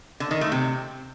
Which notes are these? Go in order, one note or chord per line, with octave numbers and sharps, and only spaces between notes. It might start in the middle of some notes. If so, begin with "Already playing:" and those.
D3
D#3
A3
C3